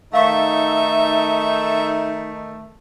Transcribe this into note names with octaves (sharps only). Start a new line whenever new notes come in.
D#3 A3 D#4 E5 F5 C#6